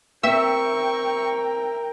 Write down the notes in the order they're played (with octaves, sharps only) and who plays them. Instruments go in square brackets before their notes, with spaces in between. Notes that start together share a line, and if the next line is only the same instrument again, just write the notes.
[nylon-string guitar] C4 [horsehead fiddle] A#4 G5 [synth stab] E5 E6 [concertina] C#6